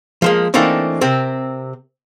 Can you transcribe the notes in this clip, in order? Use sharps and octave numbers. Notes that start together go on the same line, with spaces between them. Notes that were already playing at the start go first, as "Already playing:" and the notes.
F3 G#3 A#3
E3 A3 A#3 C4 D4 D#4
C3 C4 A#4